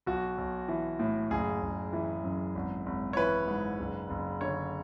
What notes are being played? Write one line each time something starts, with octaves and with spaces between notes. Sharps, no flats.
B1 F#4
B1
E3
A2
F#1 G#4
F#1
E3
F#2
G#1
G#1
C#5
E3 B4
G#2
F#1
F#1
D3 C#5